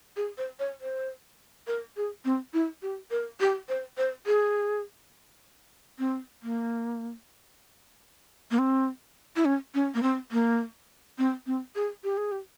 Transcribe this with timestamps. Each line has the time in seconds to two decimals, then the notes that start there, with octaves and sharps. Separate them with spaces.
0.16 G#4
0.38 C5
0.59 C#5
0.81 C5
1.67 A#4
1.97 G#4
2.25 C4
2.54 E4
2.82 G4
3.11 A#4
3.40 G4
3.69 C5
3.97 C5
4.26 G#4
5.99 C4
6.43 A#3
8.51 A#3
8.58 C4
9.36 E4
9.45 C#4
9.74 C#4
9.94 A#3
10.03 C4
10.31 A#3
11.18 C4
11.46 C4
11.75 G#4
12.04 G4
12.17 G#4
12.32 G4